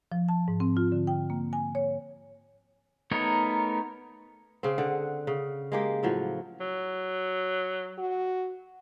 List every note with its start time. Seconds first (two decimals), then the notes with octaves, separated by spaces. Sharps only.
0.12 F3
0.29 A5
0.48 G#2
0.60 C4
0.77 F4
0.92 D3
1.07 G5
1.30 A#3
1.53 G#5
1.75 C#5
3.11 A3 B3 D#4 A#4 C#5
4.63 C#3 C4
4.78 D3 F#5
5.27 C#3
5.72 G#3 A#3 G4
6.03 A2 F3 F#3
6.60 F#3
7.98 F#4